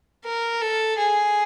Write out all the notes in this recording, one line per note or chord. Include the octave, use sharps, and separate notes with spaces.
A#4
A4
G#4